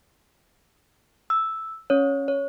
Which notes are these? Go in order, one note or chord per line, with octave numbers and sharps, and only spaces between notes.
E6
C#4 C#5
C#5